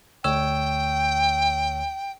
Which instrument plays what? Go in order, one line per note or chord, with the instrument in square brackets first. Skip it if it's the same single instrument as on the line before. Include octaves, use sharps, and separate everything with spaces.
[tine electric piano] D2 C#5 E6 [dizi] G5